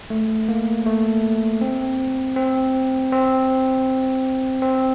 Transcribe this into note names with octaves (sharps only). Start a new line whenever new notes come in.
A3
A#3
A3
C4
C4
C4
C4